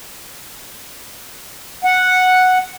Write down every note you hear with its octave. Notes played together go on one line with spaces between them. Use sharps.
F#5